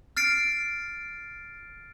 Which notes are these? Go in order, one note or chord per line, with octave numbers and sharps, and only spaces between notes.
F6 A6 C7 D7